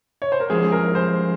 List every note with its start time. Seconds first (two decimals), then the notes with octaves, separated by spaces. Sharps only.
0.22 C#5
0.32 C5
0.40 A#4
0.50 G2 F3 G#3 C#4 G#4
0.72 A#4
0.95 C5